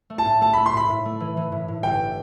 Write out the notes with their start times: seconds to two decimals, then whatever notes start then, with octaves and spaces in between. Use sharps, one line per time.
0.10 A3
0.18 A5
0.25 A2
0.41 A3 A5
0.53 B5
0.58 A3
0.66 C6
0.73 A2 B5
0.90 A2
1.05 A3
1.20 E3
1.37 E3
1.52 A2
1.68 A2
1.83 G1 G5